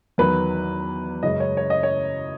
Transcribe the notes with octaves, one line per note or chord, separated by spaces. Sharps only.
E2 D#3 F#3 B4
F#2 C#3 G#3 C#4 D#5
C#5
C#5
D#5
C#5